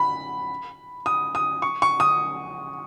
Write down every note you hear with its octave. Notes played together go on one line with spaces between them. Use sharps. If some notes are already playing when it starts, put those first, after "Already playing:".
Already playing: B5
D#6
D#6
C#6
C#6
D#6